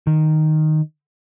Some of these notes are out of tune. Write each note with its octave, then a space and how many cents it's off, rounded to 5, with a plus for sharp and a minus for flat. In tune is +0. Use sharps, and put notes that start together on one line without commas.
D#3 -5